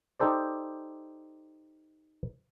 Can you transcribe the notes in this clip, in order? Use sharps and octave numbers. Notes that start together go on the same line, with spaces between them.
D#4 G4 A4 C5 D5